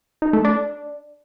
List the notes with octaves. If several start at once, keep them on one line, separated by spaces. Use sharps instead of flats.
D#4
A3
D4